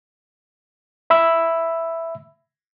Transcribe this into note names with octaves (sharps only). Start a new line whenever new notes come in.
E5 B5 E6